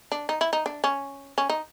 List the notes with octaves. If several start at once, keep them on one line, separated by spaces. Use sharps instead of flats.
D4
D#4
E4
D#4
D4
C#4
C#4
D#4